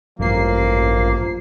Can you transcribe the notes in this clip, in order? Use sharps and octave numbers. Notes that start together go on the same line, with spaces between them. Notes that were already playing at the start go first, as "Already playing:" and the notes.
A1 G2 F3 A#3 C7